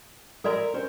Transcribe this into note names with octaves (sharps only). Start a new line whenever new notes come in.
A4 A#4 D5 E5 A#5 C6
C#4 A#4 C5